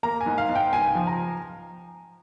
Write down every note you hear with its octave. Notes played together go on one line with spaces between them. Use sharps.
A#3 A#5
G#5
G#2
F5
G#2
G5
C#2 G#5
F3
A#5